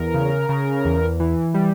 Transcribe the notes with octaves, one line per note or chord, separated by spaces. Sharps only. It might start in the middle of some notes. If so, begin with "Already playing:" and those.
Already playing: E2 A#4
C#3
C#3
E2
E3
G3